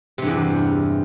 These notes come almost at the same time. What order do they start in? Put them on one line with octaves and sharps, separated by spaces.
C3 G2 E2